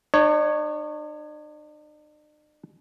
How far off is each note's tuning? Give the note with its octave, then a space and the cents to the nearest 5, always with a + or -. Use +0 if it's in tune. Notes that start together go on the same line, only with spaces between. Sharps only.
D4 +45 C#5 +0